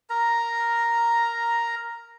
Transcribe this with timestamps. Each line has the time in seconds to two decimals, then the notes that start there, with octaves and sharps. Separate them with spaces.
0.10 A#4 A#5